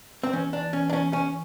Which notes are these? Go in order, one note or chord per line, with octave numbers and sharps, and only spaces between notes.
C4
E3 C#4
D4
C#4
D4
C#4
C#4